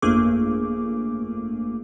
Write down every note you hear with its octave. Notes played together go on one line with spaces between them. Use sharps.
G1 F2 A3 A#3 G#4 D6